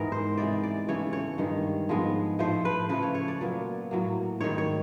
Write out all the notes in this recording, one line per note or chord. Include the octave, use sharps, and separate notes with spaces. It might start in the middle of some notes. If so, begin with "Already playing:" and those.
Already playing: G#2 E3 G#3 B3 A#4
C5
C3 E3 G#3 B3 D5
D5
C#3 E3 A3 C#5
C#5
G2 D#3 G#3
G#2 F3 G#3 B3
A2 F3 A3 C5
B4
C#3 F3 A3 B4
C#5
C#5
D5
A#2 F#3 B3
A2 F#3 A#3
G#2 D#3 G3 C#5
C#5